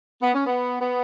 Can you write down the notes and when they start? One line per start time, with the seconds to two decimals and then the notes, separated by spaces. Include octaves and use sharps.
0.21 B3
0.33 C#4
0.45 B3
0.79 B3